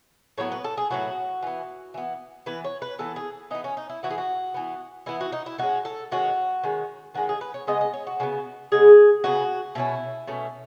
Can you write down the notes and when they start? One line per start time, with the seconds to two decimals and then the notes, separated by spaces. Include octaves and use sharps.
0.38 A2 F#3 B3 C#5
0.52 B4
0.64 A4
0.77 G#4
0.90 A2 F#3 B3 F#4
1.42 E3 B3
1.94 E3 B3
2.46 E3 B3 B4
2.64 C#5
2.82 B4
2.99 E3 B3 A4
3.16 G#4
3.50 E3 D#4
3.55 B3
3.64 C#4
3.77 D#4
3.90 E4
4.03 E3 B3 F#4
4.10 G#4
4.18 F#4
4.54 E3 B3
5.06 E3 B3 E4
5.21 F#4
5.32 D#4
5.46 E4
5.58 D#3 G#3 C#4 F#4
5.85 A4
6.11 D#3 G#3 C#4 F#4
6.63 D#3 G#3 C#4
7.14 D#3 G#3 C#4 F#4
7.29 G#4
7.41 B4
7.54 C#5
7.67 C#3 G#3 B3 D#5
7.81 D#5
7.93 C#5
8.07 F#4
8.20 C#3 G#3
8.23 B3
8.72 C#3 G#3 B3 G#4
9.24 C#3 G#3 B3 F#4
9.75 B2 A3 C#4 E4
10.27 B2 A3 C#4